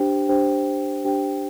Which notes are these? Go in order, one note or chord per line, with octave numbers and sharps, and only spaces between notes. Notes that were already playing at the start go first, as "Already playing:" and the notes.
Already playing: D4 G4 C5 G5
D4 G4 C5 G5
D4 G4 C5 G5